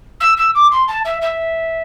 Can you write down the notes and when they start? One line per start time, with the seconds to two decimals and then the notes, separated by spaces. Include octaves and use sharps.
0.20 E6
0.37 E6
0.55 D6
0.72 C6
0.88 A5
1.05 E5
1.22 E5